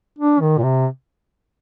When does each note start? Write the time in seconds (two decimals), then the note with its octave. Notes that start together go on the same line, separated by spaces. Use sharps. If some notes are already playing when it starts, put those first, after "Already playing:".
0.19 D4
0.40 D#3
0.58 A#2
0.63 C3